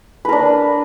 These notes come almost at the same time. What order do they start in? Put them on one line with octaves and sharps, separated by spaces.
B4 A#4 D4